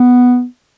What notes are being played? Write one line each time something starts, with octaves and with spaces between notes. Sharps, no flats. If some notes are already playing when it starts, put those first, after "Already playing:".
Already playing: B3